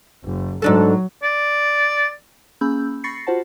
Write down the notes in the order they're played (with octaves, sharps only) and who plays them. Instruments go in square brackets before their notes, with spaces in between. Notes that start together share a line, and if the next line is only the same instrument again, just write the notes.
[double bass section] F#1
[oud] G#2 D4 A4 [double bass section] F#3
[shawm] D5
[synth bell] A#3 C#4 G#4 B5 E6 G6
B5 C#6 A6 A#6 C7 C#7
F4 F#4 C5 F#5 A5